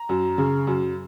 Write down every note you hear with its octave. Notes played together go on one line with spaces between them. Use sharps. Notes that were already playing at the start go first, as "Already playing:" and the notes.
Already playing: A#5
F#2
C#3
F#2